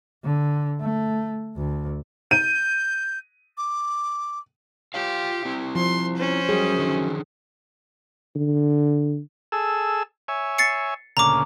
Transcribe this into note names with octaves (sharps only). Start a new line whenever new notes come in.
D3
A3
D2
G6 D#7
D6
F4 G4 C#5 F5
C4 E4
F3 C6
C#4 C5
F#2 G3 G#4
D3 D#3
D3
G#4 A4 E6
C#5 E5 G#5
A6 C7 C#7
D2 A#2 C#3 A#5 D6